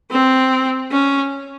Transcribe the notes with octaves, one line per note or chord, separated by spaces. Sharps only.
C4
C#4